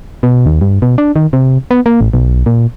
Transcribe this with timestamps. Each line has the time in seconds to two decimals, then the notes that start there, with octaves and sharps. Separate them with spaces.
0.23 B2
0.46 D#2
0.61 G2
0.82 B2
0.98 D4
1.16 D#3
1.33 C3
1.71 B3
1.86 A#3
2.01 A1
2.13 B1
2.46 A#2